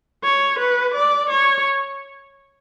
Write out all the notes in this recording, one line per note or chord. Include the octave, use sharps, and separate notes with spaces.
C#5
B4
D5
C#5